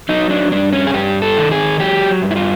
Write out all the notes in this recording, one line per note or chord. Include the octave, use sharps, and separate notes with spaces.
F#3 D#4
D4
G2 D4
C#4
G#4
G2 G4
A4
D#3
G#4
F#3 G4
G2
E4
F4